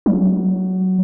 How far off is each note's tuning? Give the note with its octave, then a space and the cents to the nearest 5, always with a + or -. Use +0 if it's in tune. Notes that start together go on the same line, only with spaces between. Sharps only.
F#3 +10